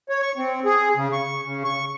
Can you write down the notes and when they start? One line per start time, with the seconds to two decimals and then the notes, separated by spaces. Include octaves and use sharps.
0.09 C#5
0.22 C#6
0.37 C4
0.65 G#4
0.96 C#3
1.13 C#6
1.45 C#3
1.64 C#6